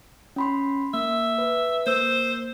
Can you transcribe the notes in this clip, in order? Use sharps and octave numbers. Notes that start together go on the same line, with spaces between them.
C#4 B5 C6
A#3 E5
B4
A#3 C5 E6